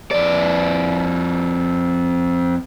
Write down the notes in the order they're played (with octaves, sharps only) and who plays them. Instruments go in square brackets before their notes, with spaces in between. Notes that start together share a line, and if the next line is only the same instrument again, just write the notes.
[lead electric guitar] F2 D5